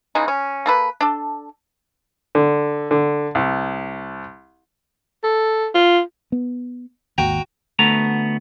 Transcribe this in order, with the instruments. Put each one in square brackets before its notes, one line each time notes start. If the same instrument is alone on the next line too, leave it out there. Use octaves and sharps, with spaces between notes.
[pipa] C#3 E3 G#3 D#4
C#4
A#3 A4 B4
D4 A4
[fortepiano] D3
D3
C2
[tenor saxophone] A4
F4
[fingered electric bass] B3
[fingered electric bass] G#1 D#2 [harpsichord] F#4 G5 A#5
[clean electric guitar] D2 A3 B3 A#5